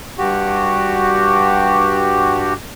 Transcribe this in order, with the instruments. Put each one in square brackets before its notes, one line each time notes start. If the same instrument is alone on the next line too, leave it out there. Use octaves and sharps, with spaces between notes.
[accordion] G2 F#4 G4